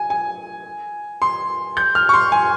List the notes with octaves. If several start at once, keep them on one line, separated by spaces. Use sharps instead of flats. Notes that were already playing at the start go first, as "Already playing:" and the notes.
Already playing: G#5
G#5
C6
G6
F6
C#6
C6
G#5